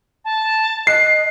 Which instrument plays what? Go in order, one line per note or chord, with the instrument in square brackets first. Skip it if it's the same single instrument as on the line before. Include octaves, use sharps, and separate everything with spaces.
[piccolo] A5
[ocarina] D#5 [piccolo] F#6 [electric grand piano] C7